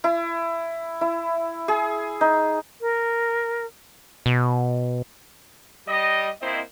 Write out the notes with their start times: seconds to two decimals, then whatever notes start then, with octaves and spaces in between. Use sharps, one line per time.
0.04 E4
1.01 E4
1.68 G#4
2.21 D#4
2.81 A#4
4.26 B2
5.87 G3 D#5
6.41 A#3 C4 E4 C5 D#5